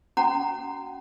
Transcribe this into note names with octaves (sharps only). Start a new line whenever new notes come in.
C#4 F#4 F#5 A#5